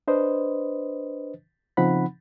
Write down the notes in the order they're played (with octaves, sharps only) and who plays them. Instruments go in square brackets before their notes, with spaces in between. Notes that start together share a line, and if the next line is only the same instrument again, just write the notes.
[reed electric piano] D4 B4 C5 D#5
C#3 F3 C4 D#4 F#5 B5